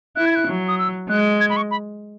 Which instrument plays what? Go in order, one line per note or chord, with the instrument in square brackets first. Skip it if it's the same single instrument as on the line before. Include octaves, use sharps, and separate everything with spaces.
[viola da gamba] E4 [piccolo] F#6
[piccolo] G#6
F#6
[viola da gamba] F#3
[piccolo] D#6
E6
[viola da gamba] G#3 [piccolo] F#6
[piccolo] G#6
B5
C#6
B5